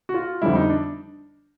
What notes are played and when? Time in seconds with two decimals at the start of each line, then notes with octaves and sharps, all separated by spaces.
0.09 F#4
0.14 F4
0.42 F2 D3 G3 E4
0.55 D#4
0.69 D4